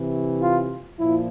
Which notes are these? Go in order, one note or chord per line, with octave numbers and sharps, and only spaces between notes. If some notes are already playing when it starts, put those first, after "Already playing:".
Already playing: C3 E3
F4
A#2 F3 E4